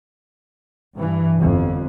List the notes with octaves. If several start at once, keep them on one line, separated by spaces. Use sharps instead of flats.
G2 E3
G1 F2